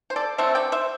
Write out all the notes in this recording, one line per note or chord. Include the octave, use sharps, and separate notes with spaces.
C5
A4 D5
D3 A3 C4 E4 C5 E5
D5 G5
C5 E5